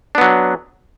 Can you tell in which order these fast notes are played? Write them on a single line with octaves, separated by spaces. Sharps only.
D4 B3 F#3